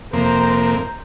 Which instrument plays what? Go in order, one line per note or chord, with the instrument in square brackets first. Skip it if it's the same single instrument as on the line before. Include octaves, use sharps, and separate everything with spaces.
[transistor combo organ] F2 C3 A#3 [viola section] C5 A#5